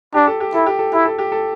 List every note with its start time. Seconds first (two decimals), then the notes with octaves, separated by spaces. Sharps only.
0.14 D4 G4
0.27 A4
0.40 G4
0.54 E4 A4
0.66 G4
0.79 A4
0.93 E4 G4
1.05 A4
1.18 G4
1.32 A4